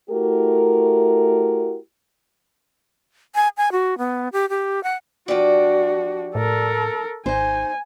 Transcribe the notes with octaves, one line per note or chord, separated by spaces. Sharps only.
A3 E4 F#4 G4 A#4
G#5
G#5
F#4
B3
G4
G4
F#5
F3 D4 F#4 G4 D5
A2 A4 A#4
G#1 D#4 C5 G#5